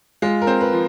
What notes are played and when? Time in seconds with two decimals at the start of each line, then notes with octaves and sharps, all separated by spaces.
0.22 G#3 F4
0.42 A#4
0.47 C4
0.61 B4
0.73 F3